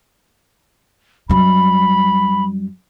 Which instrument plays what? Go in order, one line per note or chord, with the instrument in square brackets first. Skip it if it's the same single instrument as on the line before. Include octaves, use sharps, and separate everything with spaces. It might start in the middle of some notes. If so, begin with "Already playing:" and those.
[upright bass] F#2 G3 [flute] B5